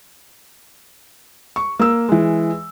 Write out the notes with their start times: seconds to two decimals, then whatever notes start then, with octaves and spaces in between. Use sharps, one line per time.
1.56 C#6
1.79 A#3 E6
2.09 E3 G#3